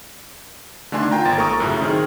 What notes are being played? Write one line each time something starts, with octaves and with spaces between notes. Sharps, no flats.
D3 D#3 A3 D4 G#5 C6
F4 G5 G#5 A#5
G#1 A#3 A6
A4 A#4 A#5 C#6 D#6
F#2 A2 C#3
D#3 C4 G#4 F6